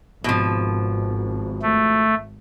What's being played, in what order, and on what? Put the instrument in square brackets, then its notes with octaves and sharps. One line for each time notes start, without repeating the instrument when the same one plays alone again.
[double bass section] G#1 [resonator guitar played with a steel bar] B2 F3
[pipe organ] A3